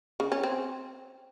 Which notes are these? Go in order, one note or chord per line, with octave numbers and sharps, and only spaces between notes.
C#3
C#4
C4